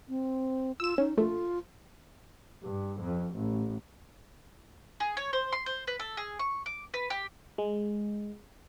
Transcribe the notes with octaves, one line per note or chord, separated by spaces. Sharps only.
C4
F4 E6 E7
C#4 D#4
A#1 A3 F4
G2
F2
A1
G#4
C#5
C5
C6
C5
B4
A4
G#4
C#6
D6
B4
G4
G#3